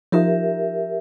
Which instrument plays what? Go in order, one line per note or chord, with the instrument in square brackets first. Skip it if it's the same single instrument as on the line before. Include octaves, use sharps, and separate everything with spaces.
[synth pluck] F3 D#4 F4 [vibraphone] G4 A#4 E5